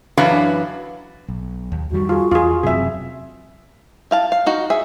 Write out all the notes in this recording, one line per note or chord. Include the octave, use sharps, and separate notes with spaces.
F#2 E3 F#3 D4 B4 F5
B1
D#2
F2 D#3 G3 F#4
F4 G#4
E2 F4 G#4
E1 F#2 C3 C4 G#4 E5
E4 F5 A5
F5
D#4 F#4
G#4 E5